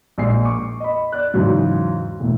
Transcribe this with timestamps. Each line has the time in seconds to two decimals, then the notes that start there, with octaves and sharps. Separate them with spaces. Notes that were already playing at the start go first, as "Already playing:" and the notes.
0.18 A#1 A#2 G#3 C7
0.45 C#6 D6
0.80 D#5 B5
1.12 D5 F#6
1.34 E2 G#2 C#3 F#3
2.20 E1 A2